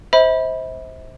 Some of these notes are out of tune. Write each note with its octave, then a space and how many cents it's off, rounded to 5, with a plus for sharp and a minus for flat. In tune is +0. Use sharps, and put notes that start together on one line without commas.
C5 +0 E5 -40 B5 -10